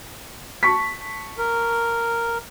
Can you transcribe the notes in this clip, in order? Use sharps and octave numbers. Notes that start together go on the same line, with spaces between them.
A5 C#6 B6
A#4